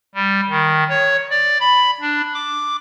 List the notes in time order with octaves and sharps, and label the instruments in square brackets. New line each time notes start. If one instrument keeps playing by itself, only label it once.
[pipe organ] G3
D#3
C#5
D5
B5
D4
D6